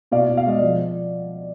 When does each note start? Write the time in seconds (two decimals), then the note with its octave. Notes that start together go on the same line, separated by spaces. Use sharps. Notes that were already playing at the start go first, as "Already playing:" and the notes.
0.11 B2 D5 F5
0.28 B2
0.37 F5
0.46 G#3 D#5
0.59 F3 D5